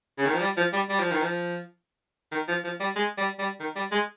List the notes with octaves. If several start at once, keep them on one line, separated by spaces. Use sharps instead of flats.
C#3
D#3
F3
G3
F3
G3
G3
F3
D#3
F3
D#3
F3
F3
G3
G#3
G3
G3
D#3
G3
G#3